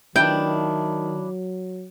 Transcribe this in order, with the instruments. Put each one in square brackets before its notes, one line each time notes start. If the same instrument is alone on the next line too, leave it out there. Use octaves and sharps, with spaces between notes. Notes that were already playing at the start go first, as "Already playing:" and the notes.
[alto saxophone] D#3 [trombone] F#3 [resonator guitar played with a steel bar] D4 E4 [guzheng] G5